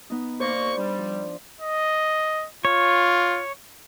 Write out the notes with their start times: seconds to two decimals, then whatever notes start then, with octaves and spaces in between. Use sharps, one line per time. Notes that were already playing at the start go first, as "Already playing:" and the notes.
0.10 B3 D#4
0.40 C2 A#3 C5 D5 C#6
0.77 G3 D4
0.98 F3
1.61 D#5
2.65 F4 C#5